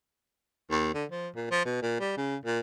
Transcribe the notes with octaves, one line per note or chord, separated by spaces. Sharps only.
D#2
D3
F3
A#2
F3
B2
A#2
G3
C#3
A#2